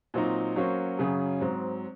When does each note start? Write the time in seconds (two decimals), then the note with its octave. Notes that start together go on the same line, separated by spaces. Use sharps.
0.14 A#2 F#3 C4 D#4
0.56 F#3 A#3 C#4 F#4 C5
0.99 F#2 C#3 F#3 C#4 G#4
1.41 G#2 F#3 C4